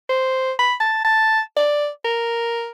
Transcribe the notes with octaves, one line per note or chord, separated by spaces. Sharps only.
C5
B5
A5
A5
D5
A#4